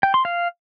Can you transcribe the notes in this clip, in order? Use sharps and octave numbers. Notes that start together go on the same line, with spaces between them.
G5
C6
F5